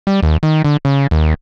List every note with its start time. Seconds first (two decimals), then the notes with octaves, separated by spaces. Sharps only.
0.07 G3
0.23 D#2
0.43 D#3
0.65 D3
0.85 C#3
1.11 D#2